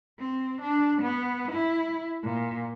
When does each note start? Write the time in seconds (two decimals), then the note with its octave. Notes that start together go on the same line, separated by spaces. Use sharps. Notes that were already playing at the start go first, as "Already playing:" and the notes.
0.19 C4
0.62 D4
1.02 B3
1.52 E4
2.24 A#2